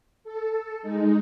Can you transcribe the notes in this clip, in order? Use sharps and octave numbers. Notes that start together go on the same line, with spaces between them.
A4
G#3 D#4